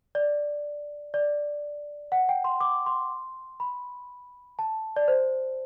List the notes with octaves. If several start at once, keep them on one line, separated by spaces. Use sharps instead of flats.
D5
D5
F#5
G5
C6
D6
C6
B5
A5
D5
C5